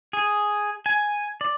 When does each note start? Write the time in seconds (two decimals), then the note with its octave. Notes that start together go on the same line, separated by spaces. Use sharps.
0.13 G#4
0.86 G#5
1.41 D5